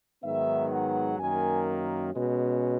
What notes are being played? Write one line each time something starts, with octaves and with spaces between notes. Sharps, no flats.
G#2 D#3 F#3 B3 E5
F#5
F#2 D#3 A#3 G#5
B2 G#3 C#4